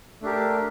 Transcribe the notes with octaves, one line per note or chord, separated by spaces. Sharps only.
A3 D4 G4 A#4